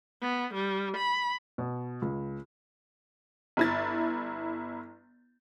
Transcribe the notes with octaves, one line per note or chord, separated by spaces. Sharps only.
B3
G3
B5
B2
C#2
G1 E4 A6